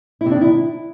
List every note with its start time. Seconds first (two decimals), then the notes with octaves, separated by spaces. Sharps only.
0.21 E4
0.26 C3
0.31 D4
0.36 D#3
0.41 E4